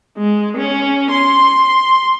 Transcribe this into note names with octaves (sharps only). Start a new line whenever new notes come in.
G#3
C#4
C6